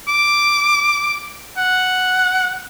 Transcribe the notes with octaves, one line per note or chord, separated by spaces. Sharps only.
D6
F#5